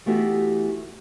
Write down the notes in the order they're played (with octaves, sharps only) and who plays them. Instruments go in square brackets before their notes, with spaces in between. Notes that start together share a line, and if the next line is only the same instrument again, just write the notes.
[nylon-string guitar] E3 A3 B3 D#4 F#4 G4